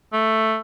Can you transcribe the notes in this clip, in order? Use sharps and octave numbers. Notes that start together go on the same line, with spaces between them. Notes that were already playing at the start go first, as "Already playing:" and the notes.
A3